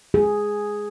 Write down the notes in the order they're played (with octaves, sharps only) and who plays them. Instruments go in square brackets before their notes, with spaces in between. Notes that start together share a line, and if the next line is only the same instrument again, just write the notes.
[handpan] G#4